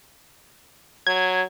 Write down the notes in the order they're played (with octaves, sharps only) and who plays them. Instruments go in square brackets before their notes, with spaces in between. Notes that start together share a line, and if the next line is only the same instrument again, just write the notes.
[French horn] F#3 [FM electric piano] G#6